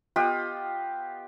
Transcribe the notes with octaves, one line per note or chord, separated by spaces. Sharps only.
B3 F4 G4 D#5